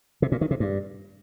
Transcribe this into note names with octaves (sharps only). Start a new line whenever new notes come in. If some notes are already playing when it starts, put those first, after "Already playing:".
C3
A#2
D#3
C3
G2